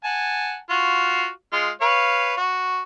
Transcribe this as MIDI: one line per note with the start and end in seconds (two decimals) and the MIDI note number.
0.04 0.58 78
0.04 0.58 80
0.04 0.58 81
0.70 1.29 65
0.70 1.29 66
1.52 1.70 56
1.52 1.70 65
1.81 2.37 71
1.81 2.37 73
1.81 2.37 77
2.37 2.81 66